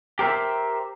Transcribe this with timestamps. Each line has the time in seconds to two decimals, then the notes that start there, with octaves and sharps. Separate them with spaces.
0.19 G4 A#4 C5 E5